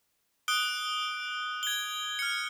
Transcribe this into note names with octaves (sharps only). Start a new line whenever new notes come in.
D#6 F#6 D7 G7
G#6 G7
F6 C#7